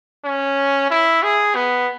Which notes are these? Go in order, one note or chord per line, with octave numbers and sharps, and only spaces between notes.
C#4
E4
G#4
B3